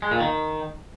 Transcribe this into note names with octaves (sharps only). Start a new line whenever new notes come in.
G#3
A#2
D#3